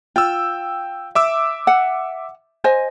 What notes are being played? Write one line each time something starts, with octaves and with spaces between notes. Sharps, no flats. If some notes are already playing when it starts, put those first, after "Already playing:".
F4 G5 E6
E5 D6 E6
F#5
C5 D#5 G#5